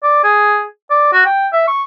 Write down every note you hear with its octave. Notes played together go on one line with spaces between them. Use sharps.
D5
G#4
D5
F#4
G5
E5
C#6